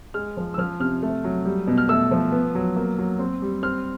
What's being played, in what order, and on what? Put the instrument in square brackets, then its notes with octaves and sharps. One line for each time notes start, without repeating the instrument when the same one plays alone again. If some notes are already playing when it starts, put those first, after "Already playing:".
[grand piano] G#3 F6
F3
E6
F3 F6
C3 F6
A3
F#3
G3
B2
F6
A3 E6
F3
B3
F#3
A#3
F#3
C4
G3
C4 F6